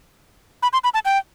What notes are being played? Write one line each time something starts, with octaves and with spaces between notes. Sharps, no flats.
B5
C6
B5
A5
G5